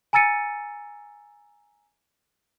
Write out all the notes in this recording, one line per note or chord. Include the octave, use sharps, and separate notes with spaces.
G#5 A#5 E6 A6 C#7 D#7